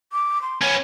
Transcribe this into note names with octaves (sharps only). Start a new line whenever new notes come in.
D6
C6
B3 C#4 C#5